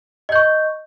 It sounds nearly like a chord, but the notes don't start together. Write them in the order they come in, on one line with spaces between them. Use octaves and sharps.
D#5 G6 C#6